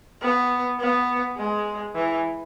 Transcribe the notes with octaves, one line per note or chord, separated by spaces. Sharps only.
B3
B3
G#3
E3